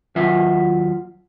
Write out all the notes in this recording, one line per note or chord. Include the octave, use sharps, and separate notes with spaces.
D#2 F#3 F4 E5